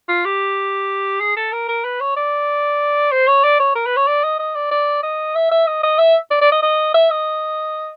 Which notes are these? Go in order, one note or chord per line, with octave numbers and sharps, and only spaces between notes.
F4
G4
G#4
A4
A#4
A#4
B4
C#5
D5
C5
C#5
D5
C#5
A#4
B4
C#5
D5
D#5
D#5
D5
D5
D#5
E5
E5
D#5
D#5
E5
D5
D5
D#5
D#5
E5
D#5